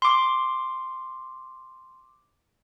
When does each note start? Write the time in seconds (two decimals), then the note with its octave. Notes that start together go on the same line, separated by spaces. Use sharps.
0.02 C6 D6